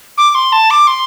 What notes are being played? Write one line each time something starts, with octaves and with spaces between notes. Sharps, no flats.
D6
C6
A5
D6
C6